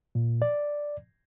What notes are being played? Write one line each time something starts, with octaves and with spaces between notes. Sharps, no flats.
A#2
D5